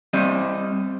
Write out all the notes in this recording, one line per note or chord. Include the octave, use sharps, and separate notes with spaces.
G3 C4 D#5